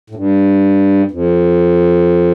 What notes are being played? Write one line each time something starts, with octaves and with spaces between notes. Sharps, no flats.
A2
G2
F2